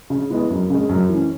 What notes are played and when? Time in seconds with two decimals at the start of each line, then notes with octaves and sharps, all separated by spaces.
0.10 C#3
0.30 G#3 B3 E4
0.50 F#2
0.70 C#3 G#3
0.89 F#2
1.09 E3 C#4